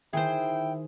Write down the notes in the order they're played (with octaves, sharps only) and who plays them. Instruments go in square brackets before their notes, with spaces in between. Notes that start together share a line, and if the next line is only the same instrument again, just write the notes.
[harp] D#3 [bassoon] E4 [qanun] G#4 C5 [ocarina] G5